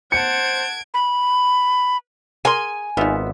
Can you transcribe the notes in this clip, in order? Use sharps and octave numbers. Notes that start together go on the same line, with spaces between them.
C5 F#5 A5 G#6 C#7 D7
B5
G#4 A#4 G#5 C6
G#1 B3 D#4 F4 E5